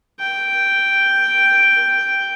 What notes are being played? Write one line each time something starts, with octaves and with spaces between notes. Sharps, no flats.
G5